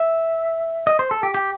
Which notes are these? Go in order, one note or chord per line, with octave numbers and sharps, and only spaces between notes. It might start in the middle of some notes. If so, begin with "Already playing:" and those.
Already playing: E5
D#5
C5
A4
G4
G4